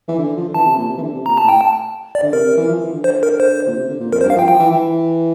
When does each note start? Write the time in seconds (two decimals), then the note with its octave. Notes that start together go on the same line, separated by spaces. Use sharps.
0.08 E3
0.18 D3
0.37 F3
0.49 D3
0.54 E3 A5
0.66 C3
0.77 A#2
0.89 C3
0.98 E3
1.02 D3
1.14 C3
1.26 A#2 A#5
1.35 C3 A5
1.44 A2
1.48 G5
1.61 A5
2.15 D5
2.22 D3
2.33 C3 A#4
2.45 C3
2.57 E3
2.69 F3
2.81 E3
2.93 D3
3.04 C5
3.23 A#4
3.40 C5
3.68 A#2
3.76 C3
3.88 D3
4.00 A#2
4.12 F2 A#4
4.21 C5
4.24 G2
4.30 F5
4.36 F3 G5
4.48 F3 G5
4.59 E3
4.72 E3